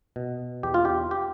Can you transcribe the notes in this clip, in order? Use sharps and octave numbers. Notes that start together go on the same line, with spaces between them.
B2
E2 G4
F4
G4
G4